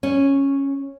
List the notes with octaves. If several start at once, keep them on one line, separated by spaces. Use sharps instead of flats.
C#4